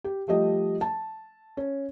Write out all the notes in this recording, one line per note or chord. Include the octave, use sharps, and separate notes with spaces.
G4
F3 G3 A3 G4 D#5
A5
C#4